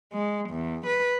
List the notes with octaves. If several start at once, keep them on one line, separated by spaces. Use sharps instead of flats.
G#3
E2
B4